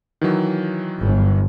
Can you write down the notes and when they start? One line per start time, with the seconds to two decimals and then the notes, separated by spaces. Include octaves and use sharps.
0.21 D#3 E3 F#3
1.02 G1